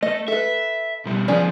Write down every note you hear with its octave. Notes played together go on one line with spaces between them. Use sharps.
A3 D#5
A4 B4 E5
B2 G3
D2 F3 C#4 G#4 D5